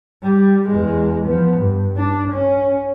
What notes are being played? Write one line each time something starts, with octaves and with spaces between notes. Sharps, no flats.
G3
E2 G#3
F3 B3
G2
D4
C#4